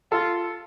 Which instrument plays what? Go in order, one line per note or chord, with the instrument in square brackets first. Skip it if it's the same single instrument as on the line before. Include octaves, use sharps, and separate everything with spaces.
[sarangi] F4 [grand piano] A4